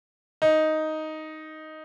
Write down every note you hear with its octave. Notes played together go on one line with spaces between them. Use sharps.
D#4